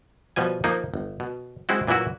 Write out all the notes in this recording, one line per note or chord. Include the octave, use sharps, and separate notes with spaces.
B2 F3 G3 G#5
F3 A#3 D#4
G1
B2
G#3 C4 E4 F#4
A#2 E3 F#3 E4 F#4